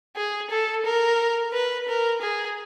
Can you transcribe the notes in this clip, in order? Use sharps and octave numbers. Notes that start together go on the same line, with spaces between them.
G#4
A4
A#4
B4
A#4
G#4